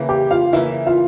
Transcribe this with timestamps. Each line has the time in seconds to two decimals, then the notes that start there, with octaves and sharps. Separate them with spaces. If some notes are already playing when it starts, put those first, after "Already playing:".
Already playing: C#3 E3 A#3
0.09 G4 G5
0.31 F4 F5
0.53 C#3 E3 A#3 E4 E5
0.87 F4 F5